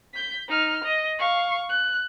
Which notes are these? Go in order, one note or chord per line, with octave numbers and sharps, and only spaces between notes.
G6 B6
D#4 F6
D#5
F5 C#6
F#6